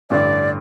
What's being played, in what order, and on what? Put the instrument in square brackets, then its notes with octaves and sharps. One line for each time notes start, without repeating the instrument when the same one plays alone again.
[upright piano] A1 G2 D3 [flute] D5